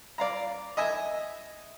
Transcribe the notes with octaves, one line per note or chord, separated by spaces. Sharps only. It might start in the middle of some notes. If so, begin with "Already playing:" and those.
D5 F5 A#5
D#5 E5 G#5